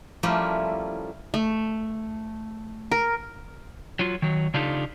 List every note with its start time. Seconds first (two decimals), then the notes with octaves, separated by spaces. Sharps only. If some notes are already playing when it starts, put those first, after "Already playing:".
0.23 F3 G3 A3 A#3 C#4 E4
1.34 A3
2.91 A#4
3.99 F#3 F4
4.22 D#3 F#3
4.54 C#3 D4 D#4 F4 G4 A4